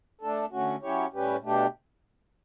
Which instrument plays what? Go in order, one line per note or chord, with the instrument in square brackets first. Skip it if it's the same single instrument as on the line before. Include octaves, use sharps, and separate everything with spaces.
[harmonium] A3 D4 A4
D3 A3 C#4 F#4
F#3 C#4 E4 G4 C#5
A2 G3 C#4 G4 B4
B2 A3 D4 G4